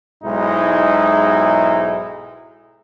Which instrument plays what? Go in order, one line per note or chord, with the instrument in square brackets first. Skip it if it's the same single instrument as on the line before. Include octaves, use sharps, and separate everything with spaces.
[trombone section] B1 G#2 G#3 D#4 E4